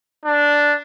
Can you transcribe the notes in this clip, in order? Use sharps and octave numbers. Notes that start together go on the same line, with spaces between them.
D4